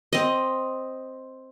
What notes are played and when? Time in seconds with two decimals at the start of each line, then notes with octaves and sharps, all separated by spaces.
0.13 C4 D#5